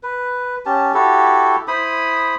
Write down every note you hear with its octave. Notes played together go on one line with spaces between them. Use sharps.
B4
C#4 G4 A5
E4 F#4 G4 A4
E4 C5 B5 D#6